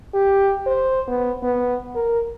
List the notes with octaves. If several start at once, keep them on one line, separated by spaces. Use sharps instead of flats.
G4
C5
B3
B3
A#4